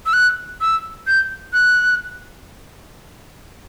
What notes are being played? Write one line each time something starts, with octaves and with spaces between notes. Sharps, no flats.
E6
F#6
E6
G6
F#6